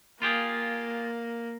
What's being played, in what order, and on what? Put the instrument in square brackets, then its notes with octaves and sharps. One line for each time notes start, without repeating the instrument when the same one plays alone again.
[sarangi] A#3 [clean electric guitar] F4 G4 G#4